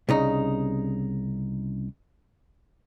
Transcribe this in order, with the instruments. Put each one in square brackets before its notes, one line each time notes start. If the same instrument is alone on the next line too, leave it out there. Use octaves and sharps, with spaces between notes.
[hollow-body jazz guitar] C2 C#3 D#4